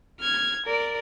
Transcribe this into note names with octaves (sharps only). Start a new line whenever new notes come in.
F6 G#6
A#4 D5